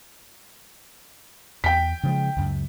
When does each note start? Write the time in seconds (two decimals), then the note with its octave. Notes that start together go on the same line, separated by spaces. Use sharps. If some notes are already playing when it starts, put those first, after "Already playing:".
1.64 E2 G5 B6
2.03 C#3 F3 G#3
2.37 C#2 F#2